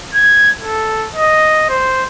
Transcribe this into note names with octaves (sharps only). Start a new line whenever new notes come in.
G#6
A4
D#5
C5